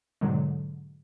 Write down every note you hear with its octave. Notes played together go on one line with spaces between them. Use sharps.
G#2 B2 D3 F#3 G#3